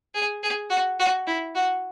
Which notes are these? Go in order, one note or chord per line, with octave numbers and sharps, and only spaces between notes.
G#4
G#4
F#4
F#4
E4
F#4